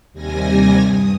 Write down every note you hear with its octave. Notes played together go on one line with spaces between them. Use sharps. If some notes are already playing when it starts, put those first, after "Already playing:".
D#2 C3 G3 G#5 A#6
G2 D#6